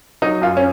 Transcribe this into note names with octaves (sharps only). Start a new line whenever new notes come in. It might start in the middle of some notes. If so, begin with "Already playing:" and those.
F#3 D#4
F#2 F4
C#4